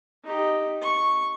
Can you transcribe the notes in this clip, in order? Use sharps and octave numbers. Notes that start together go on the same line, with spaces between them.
D#4 G4
C#6